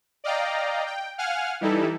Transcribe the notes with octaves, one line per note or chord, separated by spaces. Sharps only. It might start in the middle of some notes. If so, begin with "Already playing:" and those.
D5 D#5 F5 G5 A#5
G5
F5 F#5 G#5 F6
E3 G3 D#4 E4 A4